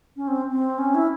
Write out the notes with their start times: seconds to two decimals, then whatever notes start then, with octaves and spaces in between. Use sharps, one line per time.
0.17 C#4
0.28 C4
0.51 C4
0.78 C#4
0.95 E4